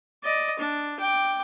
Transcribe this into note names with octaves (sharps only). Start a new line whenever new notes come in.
D5 D#5
D4
G5 D6